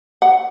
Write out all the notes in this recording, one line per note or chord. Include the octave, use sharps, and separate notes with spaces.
F#5